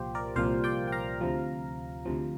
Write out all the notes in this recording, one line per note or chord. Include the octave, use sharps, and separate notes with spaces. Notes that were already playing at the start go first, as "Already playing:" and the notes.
Already playing: C2 A#2 F3 F4 G4 C5
A#4 D5
C2 A#2 F3 C5 F5
D5 G5
G5
F5 A#5
D2 C3 F3
D2 C3 F3